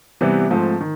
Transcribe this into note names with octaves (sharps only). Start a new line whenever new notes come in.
C3 E3 G3 B3
G#2 F3 A3 C4
D#3